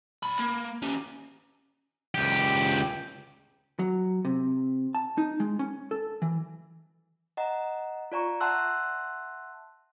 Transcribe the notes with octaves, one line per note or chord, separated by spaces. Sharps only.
A#2 B5
A#3
C#4 G4
C#2 G4
F#3
C3
A5
D#4
G#3
C#4
A4
E3
D#5 F#5 A#5
F4 D5 A#5 C#6
E5 F#5 A5 C6 E6 F#6